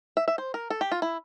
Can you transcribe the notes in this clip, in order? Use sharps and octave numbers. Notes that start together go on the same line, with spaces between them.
E5
E5
C5
A#4
A4
G4
F4
E4